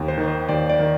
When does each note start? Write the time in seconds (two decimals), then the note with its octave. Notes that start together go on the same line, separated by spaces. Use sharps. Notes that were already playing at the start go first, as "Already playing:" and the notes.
Already playing: D#2
0.08 C5
0.18 D#3
0.28 C5
0.49 D#2 D5
0.69 D5
0.79 D#3